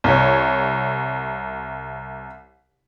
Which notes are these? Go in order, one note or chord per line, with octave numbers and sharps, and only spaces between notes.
C2 C#5